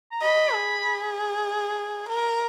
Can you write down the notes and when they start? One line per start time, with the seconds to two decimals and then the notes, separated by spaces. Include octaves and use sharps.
0.12 A#5
0.22 D#5 B5
0.54 G#4
2.09 A#4